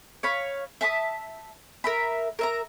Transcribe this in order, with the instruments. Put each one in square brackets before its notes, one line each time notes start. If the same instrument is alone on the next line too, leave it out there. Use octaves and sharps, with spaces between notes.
[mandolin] C#5 F5 B5
E5 A5 C6 D#6
A#4 E5 B5
A#4 E5 A#5